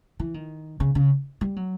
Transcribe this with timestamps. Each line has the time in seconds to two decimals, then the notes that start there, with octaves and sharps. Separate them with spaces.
0.19 E3
0.34 D#3
0.80 C#3
0.95 C#3
1.41 G3
1.56 F#3